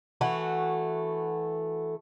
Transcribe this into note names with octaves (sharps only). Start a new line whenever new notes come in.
E3 A3 F#4